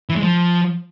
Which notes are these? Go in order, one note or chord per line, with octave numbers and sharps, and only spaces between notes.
E3
G#3
F3